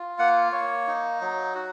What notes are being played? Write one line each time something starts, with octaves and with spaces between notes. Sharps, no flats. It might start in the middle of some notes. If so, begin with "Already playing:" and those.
Already playing: F4
A#3 F#5
A#3 C#5
D#4
F#3
F#4